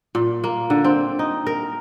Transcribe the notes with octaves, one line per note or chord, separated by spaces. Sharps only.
A#2
A#3
D3
C4
D#4
A#4